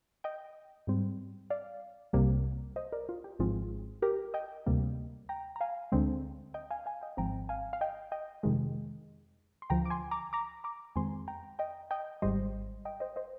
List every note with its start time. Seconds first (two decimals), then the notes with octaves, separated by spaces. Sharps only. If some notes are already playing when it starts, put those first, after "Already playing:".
0.24 D#5 G5
0.87 G#2 G3 C4
1.50 D5 F5
2.13 C2 C3 G3 A#3
2.76 C5 D#5
2.92 A#4 D5
3.09 F4
3.24 G4
3.39 G#1 G#2 F3 G#3 C4 F4 G#4
4.02 G4 A#4
4.34 D#5 G5
4.66 D2 C3 G3 A#3
5.29 G5 A#5
5.56 A#5
5.61 F5 G#5
5.92 D2 D3 G#3 C4
6.54 D#5 G5
6.70 F5 G#5
6.86 F5 G#5
7.01 D#5 G5
7.17 G#1 G#2 F3 C4 G5 A#5
7.49 F5 G#5
7.73 F5
7.81 D#5 G5
8.12 D#5 G5
8.43 F2 C3 D#3 G#3
9.62 C6
9.70 D2 D3 F3 G5 A#5
9.85 D6
9.90 G#5 C6
10.11 A#5 D6
10.33 A#5 D6
10.64 A#5 D6
10.96 F2 D#3 G#3 C4 G#5 C6
11.28 G5 A#5
11.59 D#5 G5
11.91 D#5 G5
12.22 G#1 G#2 G3 C5 D#5
12.85 D#5 G5
13.00 C5 D#5
13.16 C5 D#5